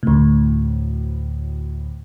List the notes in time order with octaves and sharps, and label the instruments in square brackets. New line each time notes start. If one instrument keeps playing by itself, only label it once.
[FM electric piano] D2 A2